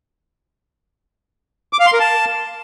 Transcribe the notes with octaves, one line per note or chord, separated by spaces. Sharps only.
D6
F5
C6
A#4
A5